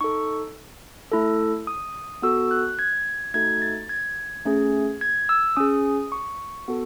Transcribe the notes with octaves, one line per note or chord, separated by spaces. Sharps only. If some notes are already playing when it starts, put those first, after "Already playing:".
D#4 A4 C#6
A3 E4 A4
D#6
B3 F#4 A4 E6
F#6
G#6
A3 D#4 F#4 A4 G#6
A6
G#6
A3 C#4 G#4
G#6
E6
C#4 G#4 D#6
C#6
B3 F#4 A4